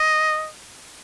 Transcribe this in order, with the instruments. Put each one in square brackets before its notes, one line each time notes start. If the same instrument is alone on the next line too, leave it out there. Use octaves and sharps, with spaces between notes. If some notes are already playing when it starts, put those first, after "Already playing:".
Already playing: [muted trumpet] D#5